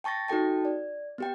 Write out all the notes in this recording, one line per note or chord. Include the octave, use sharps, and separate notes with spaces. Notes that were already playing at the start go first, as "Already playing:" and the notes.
G5 A5 C#6 A6 A#6
D#4 F#4 A4 G5 A5
D5
B3 G4 G5